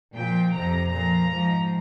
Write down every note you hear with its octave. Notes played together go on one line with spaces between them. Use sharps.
A#2 F3 G5
F2 C3 F3 A#5
A#2 F3 A#5
G#2 F3